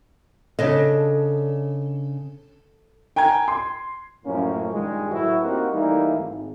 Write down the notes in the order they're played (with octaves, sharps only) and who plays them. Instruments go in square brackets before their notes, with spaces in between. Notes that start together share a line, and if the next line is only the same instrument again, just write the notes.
[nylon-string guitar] C#3 D4 D#5 [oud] A4
[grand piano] G5 G#5 A#5 G#6
C6
[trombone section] F#2 A2 F3 A#3 C#4
G2 A#2 D#3 G#3
A2 F#3 A3 E4 F#4 B4
A#3 C4 D#4 F#4 G4 A#4
E3 G3 A3 A#3 D#4
G#1